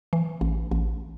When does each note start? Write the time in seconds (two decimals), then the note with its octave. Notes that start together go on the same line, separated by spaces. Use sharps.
0.13 E3
0.41 A1
0.71 A1